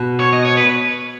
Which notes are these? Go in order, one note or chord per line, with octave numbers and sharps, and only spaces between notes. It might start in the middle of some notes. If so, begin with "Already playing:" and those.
Already playing: B2
C#5
D#5
C#5
B4